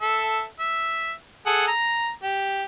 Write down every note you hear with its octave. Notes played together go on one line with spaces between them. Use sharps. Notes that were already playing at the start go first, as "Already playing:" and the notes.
A4 E5
E5
G#4 A4 F#5
A#5
G4